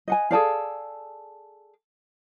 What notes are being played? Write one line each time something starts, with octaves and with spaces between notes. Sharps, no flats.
D#5 F#5 G#5
G#4 A4 D5 F5